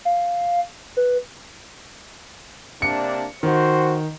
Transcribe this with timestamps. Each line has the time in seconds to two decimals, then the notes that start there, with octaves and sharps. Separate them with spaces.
0.05 F5
0.97 B4
2.82 C3 A#3 D4 C#7
3.43 D#3 F#4 C5